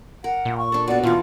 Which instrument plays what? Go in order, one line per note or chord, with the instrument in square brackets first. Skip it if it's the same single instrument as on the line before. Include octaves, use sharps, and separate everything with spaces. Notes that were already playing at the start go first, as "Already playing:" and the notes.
[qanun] A#4 [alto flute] F#5
[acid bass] A#2
[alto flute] C#6
[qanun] D4 A4
[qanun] B2 F#4 [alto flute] D5
[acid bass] A#2 [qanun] E3 A3 [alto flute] F4